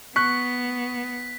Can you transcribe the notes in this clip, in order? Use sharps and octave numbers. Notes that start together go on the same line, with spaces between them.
B3 C#6 F#6 B6